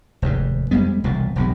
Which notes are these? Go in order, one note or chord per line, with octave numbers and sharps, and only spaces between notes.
F1 D#2 G#2
F2 G3 G#3 B3
E1 C2 F2 A#2
E1 B1 G2